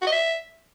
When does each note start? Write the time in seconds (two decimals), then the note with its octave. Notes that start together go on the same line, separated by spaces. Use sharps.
0.02 F#4
0.07 D#5
0.12 E5